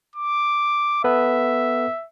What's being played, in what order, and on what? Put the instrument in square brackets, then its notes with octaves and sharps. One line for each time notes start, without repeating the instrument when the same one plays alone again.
[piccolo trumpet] D6
[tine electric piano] B3 A4 B4 [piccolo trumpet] E5